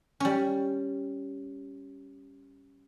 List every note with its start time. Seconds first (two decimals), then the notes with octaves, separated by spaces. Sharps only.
0.20 G3 C#4